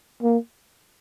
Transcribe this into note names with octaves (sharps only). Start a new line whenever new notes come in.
A#3